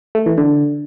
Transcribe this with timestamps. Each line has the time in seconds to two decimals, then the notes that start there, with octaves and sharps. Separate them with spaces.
0.15 A3
0.26 E3
0.38 D3